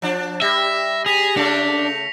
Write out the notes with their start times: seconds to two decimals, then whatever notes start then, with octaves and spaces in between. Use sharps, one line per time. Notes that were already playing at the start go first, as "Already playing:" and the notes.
0.02 F3 D4
0.42 G3 E5 A#6
1.06 G#4 B6 F7
1.37 C#3 A3 D4 C#7